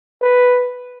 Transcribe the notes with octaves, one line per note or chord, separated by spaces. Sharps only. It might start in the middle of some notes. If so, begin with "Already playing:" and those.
B4